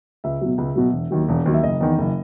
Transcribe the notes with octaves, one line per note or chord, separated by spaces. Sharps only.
C#2 E5
B2 F#3
C#2
B2 F#3
E1
D#2 D#3 F#3
E1
D#2 D#3 F#3
E5
F#1 D#5
E2 D#3
F#1